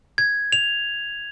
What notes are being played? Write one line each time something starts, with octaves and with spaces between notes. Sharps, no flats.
G#6
F7